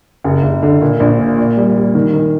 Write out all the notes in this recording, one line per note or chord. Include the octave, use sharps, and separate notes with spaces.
F#1
F#1
D3
A#2
A#1
A#2
A#2
G3
G3
D#3
D#3